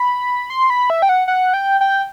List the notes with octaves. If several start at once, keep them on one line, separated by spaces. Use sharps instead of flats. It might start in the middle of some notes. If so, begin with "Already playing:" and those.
Already playing: B5
C6
B5
E5
G5
F#5
F#5
G5
G5